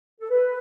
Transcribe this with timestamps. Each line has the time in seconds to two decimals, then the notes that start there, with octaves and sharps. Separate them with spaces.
0.20 A4
0.30 B4